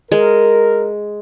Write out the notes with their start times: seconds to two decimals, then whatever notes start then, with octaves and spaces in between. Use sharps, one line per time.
0.12 G#3 A#4